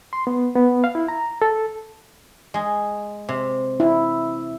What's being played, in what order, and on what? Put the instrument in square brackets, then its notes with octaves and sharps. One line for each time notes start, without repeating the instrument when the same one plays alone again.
[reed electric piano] C6
B3
B3
F5
E4
A#5
A4
[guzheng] G#3 G#4
C3
[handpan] E4